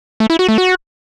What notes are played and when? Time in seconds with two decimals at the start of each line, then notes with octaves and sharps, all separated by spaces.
0.20 A3
0.30 E4
0.39 F#4
0.49 A3
0.58 F#4